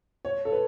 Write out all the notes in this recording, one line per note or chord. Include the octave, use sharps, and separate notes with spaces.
C#5
A4
B4